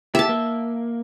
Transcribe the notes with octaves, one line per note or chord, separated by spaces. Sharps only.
G4 E5 A5
A#3